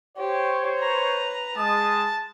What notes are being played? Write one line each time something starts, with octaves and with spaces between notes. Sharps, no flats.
G4 C5 C#5
B4 A#5
G#3 A5 D#6